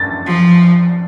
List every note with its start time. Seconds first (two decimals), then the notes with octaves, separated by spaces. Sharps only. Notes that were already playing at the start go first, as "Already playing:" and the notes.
Already playing: A6
0.26 F3